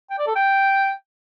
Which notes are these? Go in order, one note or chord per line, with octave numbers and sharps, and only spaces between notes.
G5
D5
A4
G5